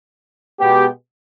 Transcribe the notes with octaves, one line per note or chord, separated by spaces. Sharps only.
B2 G#3 B3 G4